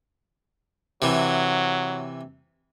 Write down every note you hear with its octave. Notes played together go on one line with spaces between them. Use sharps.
C3 E3 F#3